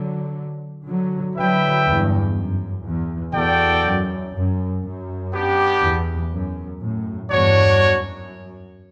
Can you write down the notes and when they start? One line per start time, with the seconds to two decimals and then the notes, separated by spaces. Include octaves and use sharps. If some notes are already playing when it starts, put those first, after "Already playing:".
Already playing: D3 F#3
0.85 D3 F#3
1.35 D3 F#3 E4 B4 E5 G5
1.85 E2 G2
2.34 F#2
2.85 E2
3.34 E2 F#4 A4 D5 G5
3.83 F#2
4.33 F#2
4.83 F#2
5.32 B3 D4 G4
5.82 E2
6.31 F#2
6.81 F#2 A2
7.30 E2 G2 D4 F#4 C#5
7.80 F#2